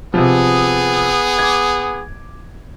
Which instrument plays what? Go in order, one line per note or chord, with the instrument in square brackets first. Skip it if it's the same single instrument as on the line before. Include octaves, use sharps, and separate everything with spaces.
[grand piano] C3 F3 [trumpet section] B3 G#4
[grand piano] D6 G#6